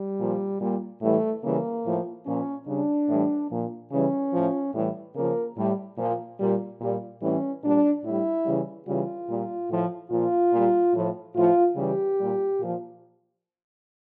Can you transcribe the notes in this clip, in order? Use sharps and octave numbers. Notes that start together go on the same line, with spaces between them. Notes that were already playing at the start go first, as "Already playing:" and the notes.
Already playing: G3
A#2 F3
A#2 G3
A2 E3 G3 A3
C#3 E3 G3 A#3
A2 F3
A#2 F3 C#4
C#3 G3 D4
A2 E3 G3
A#2 F3
C#3 E3 G3 C#4
A2 F3
A2 E3 G3
C#3 F3 A#3
A2 G3
A#2 F3
A#2 G3
A#2 G3
A2 E3 G3 C#4
A#2 G3 D4
A2 G3 E4
C#3 E3 G3
C#3 E3 G3 F4
A#2 G3
A2 F3
A#2 F3 F4
A#2 G3
A2 F3
A2 F3 F4
C#3 E3 G3 G4
A#2 G3
A#2 F3